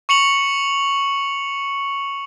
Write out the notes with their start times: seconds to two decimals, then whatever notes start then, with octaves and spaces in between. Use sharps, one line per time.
0.09 C#6 C#7 F7 F#7